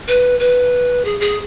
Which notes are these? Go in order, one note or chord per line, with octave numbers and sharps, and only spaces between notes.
B4
B4
G#4
G#4